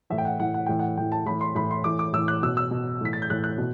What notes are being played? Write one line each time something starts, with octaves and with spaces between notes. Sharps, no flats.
A2 E3 E5
G5
F#5
A2 E3 F#5
F#5
A2 E3 G5
F#5
A2 E3 G5
A5
A2 E3 B5
C6
A2 E3 B5
C6
A2 E3 D6
D6
A2 E3 E6
F#6
B2 E6
E6
B2
A2 E3 B6
A6
G6
A2 E3 F#6
F#6
B2